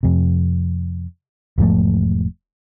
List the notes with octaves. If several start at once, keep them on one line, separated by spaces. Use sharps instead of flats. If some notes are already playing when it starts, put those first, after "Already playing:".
F2 C3
E1 G#2 F3 A3